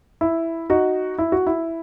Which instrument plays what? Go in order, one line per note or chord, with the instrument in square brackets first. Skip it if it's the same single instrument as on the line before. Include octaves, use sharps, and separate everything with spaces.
[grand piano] E4
D#4 F#4
E4
F#4
E4